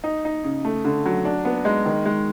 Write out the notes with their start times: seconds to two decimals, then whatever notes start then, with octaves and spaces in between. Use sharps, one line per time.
0.04 D#4
0.25 D#4
0.44 C#3
0.65 A3
0.85 D3
1.05 F#3
1.25 D4
1.45 B3
1.65 G#3
1.85 D#3
2.06 G#3